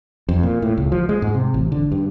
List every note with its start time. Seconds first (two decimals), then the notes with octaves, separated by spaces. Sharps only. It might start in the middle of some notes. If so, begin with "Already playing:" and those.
0.29 F2
0.43 A#2
0.62 A2
0.77 C#2
0.92 F3
1.09 G#3
1.22 G#2
1.34 C3
1.54 A1
1.72 D3
1.92 G2